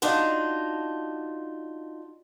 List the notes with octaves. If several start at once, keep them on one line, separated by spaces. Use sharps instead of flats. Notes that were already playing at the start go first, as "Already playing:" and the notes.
D4 D#4 F4 F#4